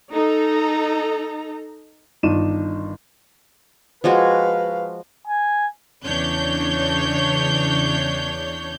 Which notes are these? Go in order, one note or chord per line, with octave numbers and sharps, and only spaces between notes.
D#4 A4 A#5
G1 D#3 D4 D#4 D#7 E7
F3 G#3 F#4 B4 F5
G#5
E2 C#3 E3 D4 C#5 G6